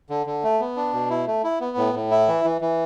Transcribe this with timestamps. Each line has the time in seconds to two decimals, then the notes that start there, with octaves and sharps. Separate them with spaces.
0.10 D3
0.27 D3
0.43 A3
0.60 B3
0.77 D4
0.93 B2
1.10 E4
1.27 A3
1.43 E4
1.60 B3
1.77 A2
1.94 A2
2.11 E4
2.28 E3
2.44 E3
2.61 E3